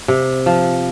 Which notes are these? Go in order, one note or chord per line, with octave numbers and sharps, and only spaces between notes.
C3
F3